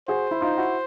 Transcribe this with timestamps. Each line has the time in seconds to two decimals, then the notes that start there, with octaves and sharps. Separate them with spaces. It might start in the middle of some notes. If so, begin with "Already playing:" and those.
0.08 F#4 G#4 C5
0.31 E4
0.41 D#4 F4
0.57 E4 F#4